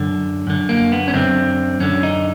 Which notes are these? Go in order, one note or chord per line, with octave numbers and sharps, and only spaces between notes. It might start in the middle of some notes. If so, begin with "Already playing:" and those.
Already playing: F#2 D3
F#2 D3
A#3
B3
C#4
F#2 D3 C4
F#2 D3 C#4
D#4